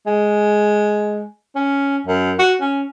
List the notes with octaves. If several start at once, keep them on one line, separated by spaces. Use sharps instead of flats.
G#3
C#4
F#2
F#4
C#4